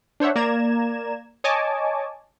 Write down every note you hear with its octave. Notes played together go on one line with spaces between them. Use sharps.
D4 C5 C#5 E5 F#5
A#3 D5 A#5 G#6 E7
C#5 D#5 G#5 A5 C#6 D6